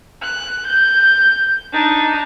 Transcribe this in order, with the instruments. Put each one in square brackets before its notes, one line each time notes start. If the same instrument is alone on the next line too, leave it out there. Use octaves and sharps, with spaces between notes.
[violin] F#6
G6
D4 D#4